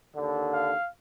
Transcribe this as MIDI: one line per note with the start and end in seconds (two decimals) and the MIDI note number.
0.15 0.73 39
0.15 0.73 50
0.53 0.88 77